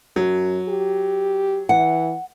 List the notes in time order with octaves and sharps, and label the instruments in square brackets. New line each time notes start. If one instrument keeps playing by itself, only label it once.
[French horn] F#2 [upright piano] F#3
[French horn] G4
[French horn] E3 [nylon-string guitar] F#5